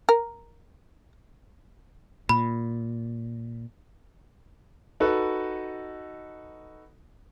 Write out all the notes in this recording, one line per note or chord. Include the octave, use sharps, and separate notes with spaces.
A#4
A#2 B5
D#4 F#4 A4 B4